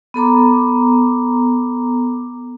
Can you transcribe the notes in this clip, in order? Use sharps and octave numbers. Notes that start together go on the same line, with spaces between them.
B3 A4 A#5 D6